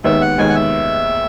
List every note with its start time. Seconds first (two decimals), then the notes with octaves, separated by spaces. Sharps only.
0.04 D#2 D#3 G#3 B3 E5
0.21 F#5
0.38 D#2 D#3 G#3 B3 G#5
0.49 F#5
0.55 E5